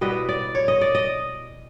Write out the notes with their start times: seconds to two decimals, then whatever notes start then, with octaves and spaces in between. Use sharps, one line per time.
0.01 B2 G3 B3 E4 D#5
0.29 D5
0.55 C#5
0.68 D#5
0.81 D5
0.95 D#5